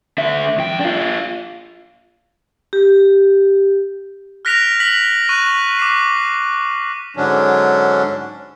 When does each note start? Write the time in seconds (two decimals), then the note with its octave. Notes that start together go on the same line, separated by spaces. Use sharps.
0.18 D3 E5
0.58 F2 G5
0.80 D4 F4
2.73 G4
4.45 F6 F#6 A#6 B6 D7 F7
4.80 B6 F#7
5.29 C#6 F#6 D#7
5.79 D6 C7
7.17 G#2 D3 F#3 C#4 D4